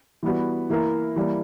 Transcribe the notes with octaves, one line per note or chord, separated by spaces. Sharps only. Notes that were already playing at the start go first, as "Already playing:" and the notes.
E3 G3 B3 F#4
E3 A#3 E4 A#4 E5
E3 G3 A#3